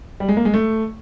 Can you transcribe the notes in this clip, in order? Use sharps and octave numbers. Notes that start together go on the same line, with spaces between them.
G3
G#3
A#3
G#3
A3